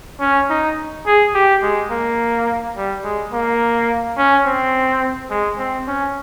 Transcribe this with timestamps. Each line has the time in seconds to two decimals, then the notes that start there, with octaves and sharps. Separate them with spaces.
0.21 C#4
0.50 D#4
1.06 G#4
1.35 G4
1.63 G#3
1.91 A#3
2.76 G3
3.04 G#3
3.33 A#3
4.18 C#4
4.46 C4
5.30 G#3
5.58 C4
5.87 C#4